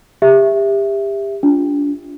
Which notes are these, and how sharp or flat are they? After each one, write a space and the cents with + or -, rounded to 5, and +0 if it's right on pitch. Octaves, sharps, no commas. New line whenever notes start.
G4 +30 E5 +0
D4 -30 F4 +0